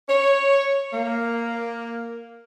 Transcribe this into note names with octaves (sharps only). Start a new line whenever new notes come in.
C#5
A#3